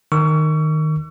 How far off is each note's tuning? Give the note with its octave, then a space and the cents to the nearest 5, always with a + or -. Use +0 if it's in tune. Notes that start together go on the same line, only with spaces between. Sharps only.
D#3 -10 C#6 +30 E6 +40